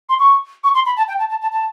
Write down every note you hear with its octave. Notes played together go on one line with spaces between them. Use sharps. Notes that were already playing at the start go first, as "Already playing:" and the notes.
C6
C#6
C#6
C6
B5
A5
G5
A5
A5
A5
A5